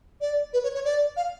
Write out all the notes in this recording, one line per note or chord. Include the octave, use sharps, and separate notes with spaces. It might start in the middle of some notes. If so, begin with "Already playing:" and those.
D5
B4
C#5
C#5
D5
F5